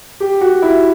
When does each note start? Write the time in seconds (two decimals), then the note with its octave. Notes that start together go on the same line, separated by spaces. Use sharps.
0.20 G4
0.41 F#4
0.62 E4